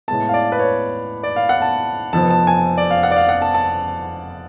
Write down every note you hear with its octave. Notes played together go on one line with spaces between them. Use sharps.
A2 G#3 B3 A5
F5
D5
B4
C#5
D5
F5
F#5
A5
F1 F2 F3 B3 A5
A5
G#5
D5
F5
F#5
D5
F5
F#5
A5
A5